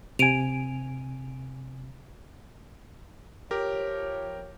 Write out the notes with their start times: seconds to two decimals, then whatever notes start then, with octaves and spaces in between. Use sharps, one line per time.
0.19 C3 G#5 D7 D#7 F7
3.51 F3 G4 A#4 C#5